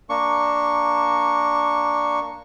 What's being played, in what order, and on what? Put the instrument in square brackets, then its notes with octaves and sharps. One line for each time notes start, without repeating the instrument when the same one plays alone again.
[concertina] A#3 D4 C#6